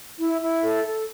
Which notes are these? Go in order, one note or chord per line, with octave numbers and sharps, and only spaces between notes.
E4
E4
A4
A4